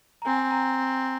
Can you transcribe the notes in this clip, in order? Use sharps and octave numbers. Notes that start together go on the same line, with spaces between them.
A#5
C4 G#5
G5
A#5